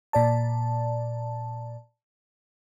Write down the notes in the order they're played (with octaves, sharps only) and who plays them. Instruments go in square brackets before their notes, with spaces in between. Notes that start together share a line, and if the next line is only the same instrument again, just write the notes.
[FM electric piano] A#2 D5 A5